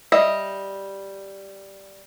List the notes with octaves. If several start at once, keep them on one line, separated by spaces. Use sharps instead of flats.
G3 D#5 E5